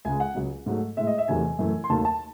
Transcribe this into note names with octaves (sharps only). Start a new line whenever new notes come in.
C#2 C#3 G#3 G#5
F#5
C#2 C#3 F#3
G#2 F#3 A3
A2 G#3 E5
D#5
E5
E2 C3 D#3 F#3 A3 G#5
F#2 E3 A3
C6
D#2 D#3 F#3 A3 A5
A5